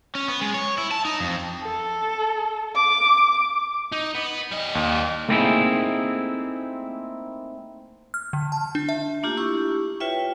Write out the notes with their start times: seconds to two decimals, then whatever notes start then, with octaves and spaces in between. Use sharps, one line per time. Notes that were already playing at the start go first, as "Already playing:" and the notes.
0.15 C#4
0.28 B3
0.41 G#3
0.54 C#5
0.78 E4
0.91 A5
1.05 D#4
1.20 F2
1.63 A4
2.75 D6
3.92 D#4
4.15 B3
4.52 G3 D#5
4.75 D#2
5.29 A3 A#3 C4 D#4 E4 G#4
8.14 F6
8.33 D3
8.52 A5
8.75 D4
8.89 E5
9.23 A3 A#3 D4 F4 G4
9.37 E4 G4 C#6
10.00 F4 B4 C#5 E5 G5